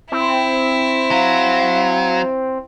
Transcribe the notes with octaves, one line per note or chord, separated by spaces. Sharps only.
C4 E4
F#3 F5